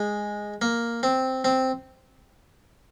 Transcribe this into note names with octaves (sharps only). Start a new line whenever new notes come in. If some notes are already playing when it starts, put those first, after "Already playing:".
Already playing: G#3
A#3
C4
C4